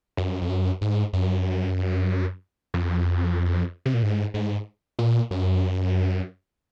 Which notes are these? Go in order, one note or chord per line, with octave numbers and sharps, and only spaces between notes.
F#2
F2
F#2
G#2
F#2
F2
C3
A#2
G#2
G#2
A#2
F#2